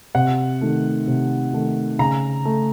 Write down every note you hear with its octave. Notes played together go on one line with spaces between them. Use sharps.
C3 F#5
D#3 A3
C3
D#3 A3
C#3 A#5
A3